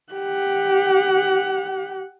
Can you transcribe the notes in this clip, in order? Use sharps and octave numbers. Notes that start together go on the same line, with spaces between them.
G4 F#5